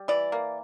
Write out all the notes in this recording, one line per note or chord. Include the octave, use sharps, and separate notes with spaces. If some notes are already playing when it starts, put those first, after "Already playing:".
Already playing: G3
E3 D5
A#3